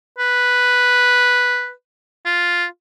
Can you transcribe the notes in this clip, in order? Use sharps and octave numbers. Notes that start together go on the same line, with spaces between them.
B4
F4